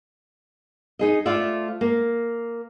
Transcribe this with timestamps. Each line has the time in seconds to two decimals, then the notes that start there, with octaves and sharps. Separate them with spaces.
0.99 D#4 G#4 D#5
1.26 A3 F4 C5 D5 E5
1.81 A#3